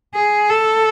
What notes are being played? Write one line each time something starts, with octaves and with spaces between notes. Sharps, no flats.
G#4
A4